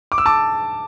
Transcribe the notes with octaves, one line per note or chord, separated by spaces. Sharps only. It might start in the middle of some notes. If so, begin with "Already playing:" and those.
D6
E6
A5 D6